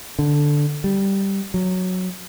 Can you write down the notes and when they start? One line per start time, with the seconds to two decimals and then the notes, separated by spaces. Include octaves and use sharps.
0.19 D3
0.84 G3
1.54 F#3